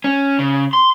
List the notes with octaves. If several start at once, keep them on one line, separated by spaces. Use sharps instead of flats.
C#4
C#3
C6